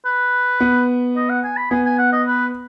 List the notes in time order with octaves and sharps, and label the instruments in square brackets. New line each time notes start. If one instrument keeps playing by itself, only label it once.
[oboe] B4
[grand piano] B3
[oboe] D#5
F#5
G#5
B5
[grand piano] B3 [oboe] G#5
[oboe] G#5
F#5
D#5
B4